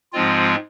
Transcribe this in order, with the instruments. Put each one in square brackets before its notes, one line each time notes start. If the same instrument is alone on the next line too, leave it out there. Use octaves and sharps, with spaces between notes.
[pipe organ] G#2 F3 G#3 C4 F4